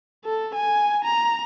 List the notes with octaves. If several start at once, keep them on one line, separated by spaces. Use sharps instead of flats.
A4
G#5
A#5